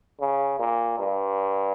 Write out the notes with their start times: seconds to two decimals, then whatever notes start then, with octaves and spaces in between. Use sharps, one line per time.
0.20 C#3
0.59 A#2
0.99 G2